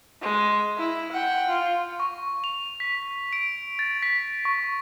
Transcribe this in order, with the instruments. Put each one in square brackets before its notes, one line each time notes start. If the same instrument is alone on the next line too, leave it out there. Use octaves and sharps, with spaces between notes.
[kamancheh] G#3
E4
F#5 G5
F4
[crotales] C#6
F7
B6
D7
A6
B6
C#6